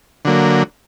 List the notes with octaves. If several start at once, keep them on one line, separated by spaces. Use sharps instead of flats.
D3 F#3 A#3